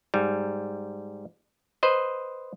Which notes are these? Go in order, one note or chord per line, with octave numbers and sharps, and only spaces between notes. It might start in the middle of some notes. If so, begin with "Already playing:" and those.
G#2 G3
B4 C5 D#5